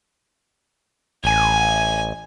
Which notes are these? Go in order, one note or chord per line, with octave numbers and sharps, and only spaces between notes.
A1 G#5